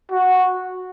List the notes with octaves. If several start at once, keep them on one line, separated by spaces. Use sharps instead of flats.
F#4